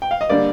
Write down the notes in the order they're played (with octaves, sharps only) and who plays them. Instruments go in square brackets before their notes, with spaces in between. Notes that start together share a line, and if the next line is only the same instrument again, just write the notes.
[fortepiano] G5
F5
D#5
D3 G3 A#3 D5